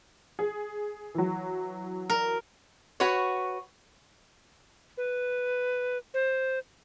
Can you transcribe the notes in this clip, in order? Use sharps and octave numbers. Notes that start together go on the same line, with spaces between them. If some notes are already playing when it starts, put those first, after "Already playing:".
G#4
E3 F#3
A#4
F#4 B4 C#5
B4
C5